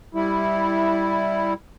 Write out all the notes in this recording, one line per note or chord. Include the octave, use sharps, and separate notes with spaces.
G3 E4